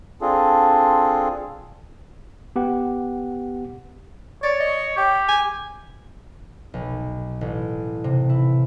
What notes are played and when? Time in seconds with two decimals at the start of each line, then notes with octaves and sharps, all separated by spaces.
0.22 C4 D4 F4 G#4 A4
2.56 B3 G4 F#5
4.43 C#5 D5
4.60 D#5
4.97 G4 G5
5.28 G#5
6.74 B1
7.41 A1
8.04 C3
8.30 E4